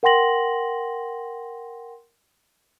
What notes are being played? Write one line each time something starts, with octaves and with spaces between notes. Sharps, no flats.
A#4 F#5 G5 C6 A#6 F#7